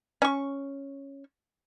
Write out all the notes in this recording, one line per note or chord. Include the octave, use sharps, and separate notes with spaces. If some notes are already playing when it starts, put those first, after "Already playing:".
C#4 C#6